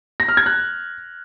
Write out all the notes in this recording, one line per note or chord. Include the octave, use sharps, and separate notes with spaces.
A#6
F6
G#6
F#6